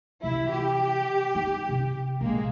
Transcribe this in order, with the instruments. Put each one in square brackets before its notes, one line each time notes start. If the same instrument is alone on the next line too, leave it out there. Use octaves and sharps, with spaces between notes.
[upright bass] C3 E3 [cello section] E4
[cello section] G4
[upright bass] D#4
C3
[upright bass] A#1 [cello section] G#3 A#3